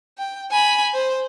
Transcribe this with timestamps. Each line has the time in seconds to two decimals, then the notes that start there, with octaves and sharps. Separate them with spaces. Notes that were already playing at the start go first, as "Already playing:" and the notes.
0.18 G5
0.51 G#5 B5
0.94 C5